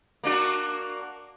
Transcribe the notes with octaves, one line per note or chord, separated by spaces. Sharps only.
A#3 D4 F#4